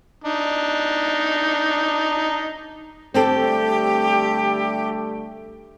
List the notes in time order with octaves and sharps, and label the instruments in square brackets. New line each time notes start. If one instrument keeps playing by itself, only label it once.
[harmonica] D4 D#4
[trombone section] D3 G3 A3 [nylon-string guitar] C4 A4 [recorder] G4